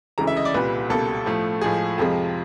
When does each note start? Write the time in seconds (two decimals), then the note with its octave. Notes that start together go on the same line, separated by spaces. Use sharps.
0.18 D2 C#3 E3 G#3 A#5
0.27 E5
0.37 D#5
0.45 D5
0.54 C2 A#2 G3 B4
0.90 C#2 B2 G3 A#3 A4
1.26 A2 F3 A3
1.61 A2 F3 G#3 G#4
1.98 F2 C3 F3 G#3